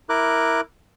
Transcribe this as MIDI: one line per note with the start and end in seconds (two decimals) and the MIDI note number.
0.09 0.61 64
0.09 0.61 70
0.09 0.61 86
0.09 0.61 90